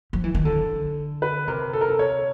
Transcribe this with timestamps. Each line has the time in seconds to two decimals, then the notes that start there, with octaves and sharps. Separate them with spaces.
0.13 F3
0.24 E3
0.35 D#3
0.45 D3 A4
1.22 B4
1.48 C3 A#4
1.73 A4
1.81 A#4
1.89 A4
1.99 C#5